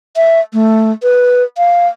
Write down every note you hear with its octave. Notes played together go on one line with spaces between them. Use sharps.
E5
A3
B4
F5